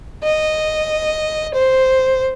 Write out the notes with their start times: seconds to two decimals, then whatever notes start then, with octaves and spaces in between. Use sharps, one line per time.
0.23 D#5
1.54 C5